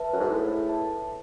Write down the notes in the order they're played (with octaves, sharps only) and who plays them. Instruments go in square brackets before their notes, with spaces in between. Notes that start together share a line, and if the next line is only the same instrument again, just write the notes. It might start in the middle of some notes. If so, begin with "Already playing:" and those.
Already playing: [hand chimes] B4 E5 A5
[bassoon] F#2
G#2
[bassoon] A2 [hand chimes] G#4
[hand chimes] B4 E5 A5